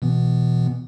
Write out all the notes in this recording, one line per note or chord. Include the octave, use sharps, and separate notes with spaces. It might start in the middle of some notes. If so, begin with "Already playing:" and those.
B2 E3 B3